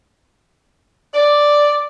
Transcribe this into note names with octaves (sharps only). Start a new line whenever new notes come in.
D5